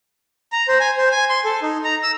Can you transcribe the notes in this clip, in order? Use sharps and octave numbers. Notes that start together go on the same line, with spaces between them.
A#5
C5
G#5
C5
G#5
C6
A4
D#4
A#5
E6